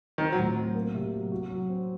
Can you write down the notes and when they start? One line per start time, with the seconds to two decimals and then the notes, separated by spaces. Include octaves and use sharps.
0.18 D#3 C4
0.32 F#3
0.37 A2
0.57 F#3
0.75 A#3
0.94 C3
1.13 F#3
1.32 F#4
1.50 F#3
1.69 C4